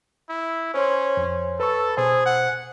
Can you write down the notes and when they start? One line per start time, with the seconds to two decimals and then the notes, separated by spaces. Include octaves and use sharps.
0.29 E4
0.74 C#4 C5 C#5 C6
1.17 F2
1.60 A4 B4 B5 C#6 E6 A6
1.97 B2 G#4 C5 G#5
2.26 F#5